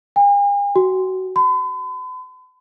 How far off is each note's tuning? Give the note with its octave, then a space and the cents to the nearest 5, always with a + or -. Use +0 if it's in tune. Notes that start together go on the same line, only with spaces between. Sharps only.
G#5 -45
F#4 +20
B5 +45